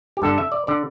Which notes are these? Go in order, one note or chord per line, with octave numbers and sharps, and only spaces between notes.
G4
G2 D3 A4
E5
D5
D3 D5